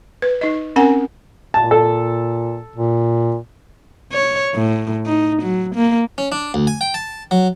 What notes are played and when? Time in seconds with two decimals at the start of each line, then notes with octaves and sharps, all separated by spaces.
0.22 B4
0.41 D#4 D#5
0.76 C4 C#4 A#4 F#5 G#5
1.54 A#2 A5
1.71 A4
2.76 A#2
4.13 C#5
4.55 A2
5.07 D#4
5.43 F#3
5.75 A#3
6.18 C#4
6.32 D4
6.54 D2
6.67 G#5
6.81 G5
6.94 A5
7.31 F#3